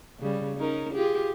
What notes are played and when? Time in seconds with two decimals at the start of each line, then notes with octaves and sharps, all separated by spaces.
0.19 C#3 G3
0.58 C#4 D#4 A#4
0.93 F4 G4 G#4